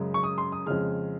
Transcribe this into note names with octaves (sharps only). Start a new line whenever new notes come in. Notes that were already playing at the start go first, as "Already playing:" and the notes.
Already playing: F#2 C#3 G#3
C#6
D#6
C6
D#6
F2 C#3 G#3 F6